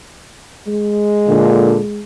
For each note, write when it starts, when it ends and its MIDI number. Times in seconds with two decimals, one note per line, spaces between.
0.67 2.02 56
1.28 1.78 46
1.28 1.78 50